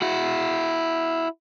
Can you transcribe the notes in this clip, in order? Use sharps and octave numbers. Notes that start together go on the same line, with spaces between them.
E4 F#4